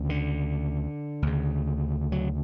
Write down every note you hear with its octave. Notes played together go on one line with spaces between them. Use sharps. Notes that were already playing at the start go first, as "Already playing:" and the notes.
Already playing: D2 C#3
D3
D2 C#3
F#3